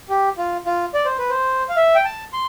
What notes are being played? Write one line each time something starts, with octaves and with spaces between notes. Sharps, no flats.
G4
F4
F4
D5
C5
B4
C5
F5
E5
G5
A5
C6